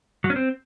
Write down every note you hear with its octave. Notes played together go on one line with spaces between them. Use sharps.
F#3
C#4
C4